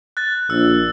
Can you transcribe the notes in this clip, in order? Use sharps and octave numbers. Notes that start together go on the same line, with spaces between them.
F#6 A6
A#1 E6